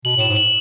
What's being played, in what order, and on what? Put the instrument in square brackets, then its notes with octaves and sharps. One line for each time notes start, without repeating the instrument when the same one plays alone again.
[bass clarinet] B2 [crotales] F#7
[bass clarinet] A2
[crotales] E7
[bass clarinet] G#2
[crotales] F#7